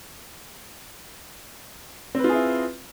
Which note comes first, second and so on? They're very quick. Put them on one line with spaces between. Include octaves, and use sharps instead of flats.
C4 B4 F4 G#4 E4